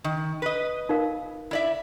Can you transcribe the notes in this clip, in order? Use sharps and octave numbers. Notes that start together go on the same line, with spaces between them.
D#3
B4 D#5
D#4 A#4 F5
E4 D5 E5